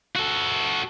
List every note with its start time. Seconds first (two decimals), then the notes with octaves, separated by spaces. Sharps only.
0.16 F#4 A4